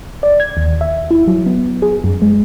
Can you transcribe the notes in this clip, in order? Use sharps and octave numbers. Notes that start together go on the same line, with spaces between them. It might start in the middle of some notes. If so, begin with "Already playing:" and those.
D5
G#6
D#2
E5
E4
F#3
B3
G#4
F#2
G#3